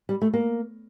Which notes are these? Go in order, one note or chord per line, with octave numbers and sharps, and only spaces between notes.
G3
A3
A#3